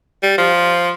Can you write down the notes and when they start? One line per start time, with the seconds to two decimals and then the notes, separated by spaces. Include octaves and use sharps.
0.23 G3
0.38 F3